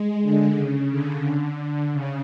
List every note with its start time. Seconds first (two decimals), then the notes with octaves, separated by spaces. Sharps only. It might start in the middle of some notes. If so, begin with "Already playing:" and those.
Already playing: G#3
0.22 D3
0.56 C#3
0.91 D3
1.24 D3
1.57 D3
1.92 C#3